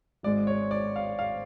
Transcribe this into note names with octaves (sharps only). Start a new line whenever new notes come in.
G#1 G#2 G#3 D5
C#5
D5
F5
F5